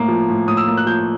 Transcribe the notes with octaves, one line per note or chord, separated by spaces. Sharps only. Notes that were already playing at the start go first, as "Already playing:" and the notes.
Already playing: A2 A#3
F3
A2
A2 D#6
E6
A#3
F#6
F3 G6